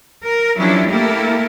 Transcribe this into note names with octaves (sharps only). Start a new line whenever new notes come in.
A#4
F3 F#3 C#4 D4 E4 G4
A3 A#3 E4 G4 A4 A#4